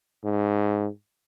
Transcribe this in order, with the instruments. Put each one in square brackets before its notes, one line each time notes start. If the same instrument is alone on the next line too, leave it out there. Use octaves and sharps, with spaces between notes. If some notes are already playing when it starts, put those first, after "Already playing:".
[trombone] G#2